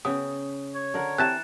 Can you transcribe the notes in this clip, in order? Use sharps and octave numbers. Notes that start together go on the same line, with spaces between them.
C#3 B3 G5 D#6
C#5
D3 A#4 F#5
E3 C4 G4 A#4 A5 F#6 A6 E7